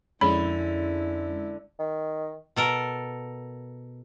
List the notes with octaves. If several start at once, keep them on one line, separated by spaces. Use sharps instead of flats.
F2 D3 G#3 C#4 E4 B5
D#3
B2 A4 A#4